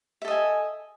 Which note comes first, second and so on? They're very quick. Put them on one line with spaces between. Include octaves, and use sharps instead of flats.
E5 A4 D#5 G#5